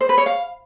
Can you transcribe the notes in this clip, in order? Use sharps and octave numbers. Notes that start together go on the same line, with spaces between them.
C5
B4
C#5
F5